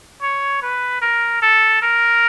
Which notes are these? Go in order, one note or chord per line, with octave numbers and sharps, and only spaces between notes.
C#5
B4
A#4
A4
A#4